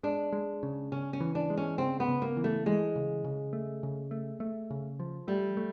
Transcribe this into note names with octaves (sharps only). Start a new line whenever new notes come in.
G#3 D4
G#3
C#3
C#3 C#4
C#4
E3
D4
G#3
C#4
C#3 C4
B3
C#3
A#3
E3
A3
E3 G#3
C#3
C#3
A3
C#3
A3
A3
C#3
F3
G3 A3
A3